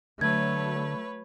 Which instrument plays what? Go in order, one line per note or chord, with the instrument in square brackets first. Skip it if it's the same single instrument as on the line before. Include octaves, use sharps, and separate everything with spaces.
[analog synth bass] D3 [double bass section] F#3 A3 [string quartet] B4 C#5 [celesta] G#6